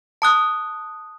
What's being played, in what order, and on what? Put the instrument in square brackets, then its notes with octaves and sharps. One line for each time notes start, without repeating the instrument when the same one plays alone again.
[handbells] A5 D#6 F#6